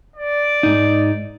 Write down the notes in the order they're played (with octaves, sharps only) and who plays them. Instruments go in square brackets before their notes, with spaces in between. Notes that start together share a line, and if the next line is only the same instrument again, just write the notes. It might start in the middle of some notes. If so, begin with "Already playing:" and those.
[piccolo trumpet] D5
[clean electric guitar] G#2 D#4